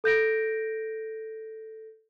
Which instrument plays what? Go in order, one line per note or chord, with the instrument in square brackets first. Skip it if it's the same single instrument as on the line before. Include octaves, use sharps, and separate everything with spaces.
[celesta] A4 G6 A#6 D7